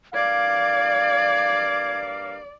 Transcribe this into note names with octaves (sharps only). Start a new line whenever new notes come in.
G2 A#3 D5 F5 G#6